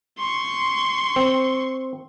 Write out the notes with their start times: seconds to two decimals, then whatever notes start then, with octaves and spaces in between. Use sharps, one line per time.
0.18 C6 C#6
1.16 C4